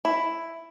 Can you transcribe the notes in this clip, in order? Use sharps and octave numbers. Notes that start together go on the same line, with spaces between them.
E4